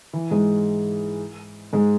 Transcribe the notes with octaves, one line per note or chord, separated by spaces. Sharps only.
E3
G#2 G#3
G#2 G#3